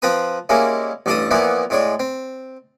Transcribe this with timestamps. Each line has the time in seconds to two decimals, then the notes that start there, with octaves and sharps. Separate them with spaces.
0.02 F3 C4 B4 A#5 D#6
0.49 G3 G#3 A#3 C#4 E4
1.06 A1 G2 A4 D5 A5 D#6
1.31 A#2 E3 F3 A#3 B3 E4
1.70 A2 G#3 C#5 D5
2.00 C4